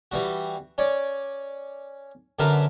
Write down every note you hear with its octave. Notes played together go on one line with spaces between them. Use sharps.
E3 G3 F#4
C#4 C#5 D5
F#2 D3 F#3 A#4 B4 A5